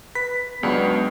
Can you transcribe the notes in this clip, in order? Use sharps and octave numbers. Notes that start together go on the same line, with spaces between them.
B4 B6
C#2 F#3 G#3 B3 D4 B4